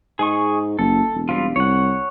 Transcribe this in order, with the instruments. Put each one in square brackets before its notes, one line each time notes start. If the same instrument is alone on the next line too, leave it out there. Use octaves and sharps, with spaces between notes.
[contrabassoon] G#2 [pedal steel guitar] G#4 D#5 C#6
[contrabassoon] F#1 [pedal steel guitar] A4
[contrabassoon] E1
[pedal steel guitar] G3 C4 F4
[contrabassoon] C2 [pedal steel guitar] C#5 F#5